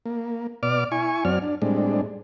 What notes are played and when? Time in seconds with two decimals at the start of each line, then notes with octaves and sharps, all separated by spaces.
0.06 A#3
0.63 B2 D5 D6 F6
0.92 E4 G#5 C#6
1.25 F#2 F#3 C4 D5 F6
1.42 D4
1.62 A2 G3 G#3 C4 D4